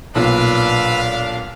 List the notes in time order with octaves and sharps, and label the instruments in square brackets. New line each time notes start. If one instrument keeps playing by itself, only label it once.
[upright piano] B1 A#2 [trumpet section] D4 F5 [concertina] B4 B5 E6